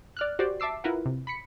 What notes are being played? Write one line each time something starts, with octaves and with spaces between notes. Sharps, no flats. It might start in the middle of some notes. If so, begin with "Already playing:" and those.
D5 F6 F#6
F#4 G4 C5 D5
E5 A5 D6 E6 C7
E4 F4 A#4 B4 F#5
C3
B5 B6 C#7